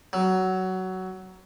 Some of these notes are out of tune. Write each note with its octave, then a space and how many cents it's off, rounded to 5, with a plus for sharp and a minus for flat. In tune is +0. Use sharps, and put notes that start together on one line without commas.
F#3 +15